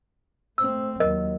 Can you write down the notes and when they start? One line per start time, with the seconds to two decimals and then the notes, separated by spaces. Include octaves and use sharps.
0.58 A3 C4 E6
1.00 D#2 F#3 A#4 D#5